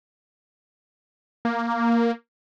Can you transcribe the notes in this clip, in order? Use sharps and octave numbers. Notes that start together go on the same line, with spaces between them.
A#3